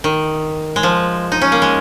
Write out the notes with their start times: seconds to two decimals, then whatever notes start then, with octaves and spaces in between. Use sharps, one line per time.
0.04 D#3
0.76 G#3
0.83 F3
1.32 D#4
1.41 C#4
1.52 A#3
1.62 G#3